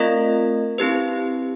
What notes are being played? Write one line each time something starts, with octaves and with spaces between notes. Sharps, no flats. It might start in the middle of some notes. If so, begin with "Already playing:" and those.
Already playing: A3 C4 F4 A#4 D#5
C4 E4 G4 B4